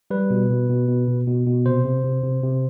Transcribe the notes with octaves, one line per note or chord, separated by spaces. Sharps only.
G3 B4
B2
B2
B2
B2
B2
B2
B2
C3 C5
C3
C3
C3
C3